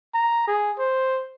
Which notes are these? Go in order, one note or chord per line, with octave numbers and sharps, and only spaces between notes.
A#5
G#4
C5